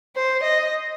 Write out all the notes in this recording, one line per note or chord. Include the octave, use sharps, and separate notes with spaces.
C5
D#5